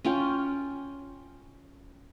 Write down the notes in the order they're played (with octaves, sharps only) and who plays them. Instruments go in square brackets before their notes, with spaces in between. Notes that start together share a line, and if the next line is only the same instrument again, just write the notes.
[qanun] C#4 F4 G5